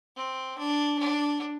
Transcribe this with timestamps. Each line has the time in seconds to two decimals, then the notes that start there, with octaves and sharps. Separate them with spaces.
0.16 C4
0.58 D4
0.98 D4